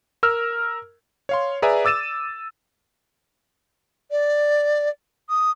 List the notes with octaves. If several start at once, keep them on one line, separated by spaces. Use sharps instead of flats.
A#4 E6 F6
C#5 F5 C6
G#4 B4 D5 E5 G#5 A#5
D6 E6 A6 D#7 E7
D5
D#6